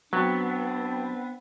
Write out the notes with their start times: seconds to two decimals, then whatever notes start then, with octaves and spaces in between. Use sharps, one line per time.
0.13 F#3 B3 C4 D4